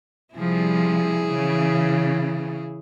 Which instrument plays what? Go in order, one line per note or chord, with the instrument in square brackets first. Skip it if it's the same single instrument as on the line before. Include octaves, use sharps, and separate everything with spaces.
[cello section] C3 F3 G3 [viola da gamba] E4 G#4
[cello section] C#3 E3